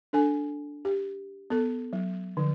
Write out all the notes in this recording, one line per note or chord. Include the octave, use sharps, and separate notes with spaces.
D4 A4 G#5
G4
B3 A4
F#3
D3 F3